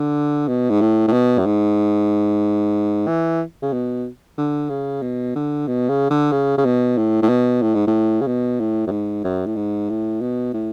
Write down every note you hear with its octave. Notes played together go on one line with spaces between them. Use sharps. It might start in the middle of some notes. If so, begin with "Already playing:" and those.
Already playing: D3
B2
G#2
A2
A2
B2
F#2
G#2
E3
C#3
B2
D3
C#3
B2
D3
B2
C#3
D3
C#3
C#3
B2
A2
A2
B2
A2
G#2
A2
C#3
B2
A2
F#2
G#2
F#2
A2
G#2
A2
B2
A2